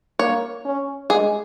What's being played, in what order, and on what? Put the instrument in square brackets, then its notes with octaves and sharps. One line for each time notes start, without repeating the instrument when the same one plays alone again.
[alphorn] A#3 [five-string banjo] C#5
[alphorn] C#4
[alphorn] G#3 [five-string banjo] G#4